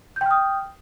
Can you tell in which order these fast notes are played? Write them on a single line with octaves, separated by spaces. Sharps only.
G6 G5 F6 D#6